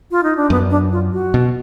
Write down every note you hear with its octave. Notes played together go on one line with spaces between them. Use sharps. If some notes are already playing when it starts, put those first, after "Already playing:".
F4
D#4
D4
F#2 B3
D4
F4
F#4
B2